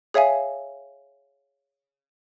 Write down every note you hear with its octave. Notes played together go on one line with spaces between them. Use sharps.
G#4 C#5 E5 F5 G#5